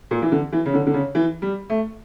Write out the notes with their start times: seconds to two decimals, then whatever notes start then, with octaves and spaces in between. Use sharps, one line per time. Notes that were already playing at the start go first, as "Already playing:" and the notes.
0.11 A#2
0.22 E3
0.32 D3
0.53 E3
0.65 C#3
0.74 D3
0.87 D3
0.94 C#3
1.15 E3
1.42 G3
1.70 A3